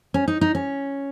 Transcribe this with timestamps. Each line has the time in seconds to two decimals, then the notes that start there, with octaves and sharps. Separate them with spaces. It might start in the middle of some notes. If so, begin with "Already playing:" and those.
0.14 C#4
0.28 D#4
0.41 D#4
0.55 C#4